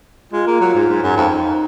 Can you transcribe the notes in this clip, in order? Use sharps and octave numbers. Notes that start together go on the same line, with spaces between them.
G#3 F4
A#3
F#3
G#2
G#2
F#2
F2 D#4